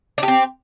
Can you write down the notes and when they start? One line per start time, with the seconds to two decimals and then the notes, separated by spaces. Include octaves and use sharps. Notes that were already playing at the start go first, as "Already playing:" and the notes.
0.18 D4
0.23 G4
0.28 C4